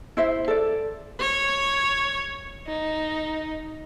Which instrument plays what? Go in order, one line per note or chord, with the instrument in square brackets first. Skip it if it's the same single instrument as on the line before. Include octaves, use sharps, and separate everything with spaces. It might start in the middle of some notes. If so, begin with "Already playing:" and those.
[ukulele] E4 C5 E5
A4 D5
[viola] C#5
D#4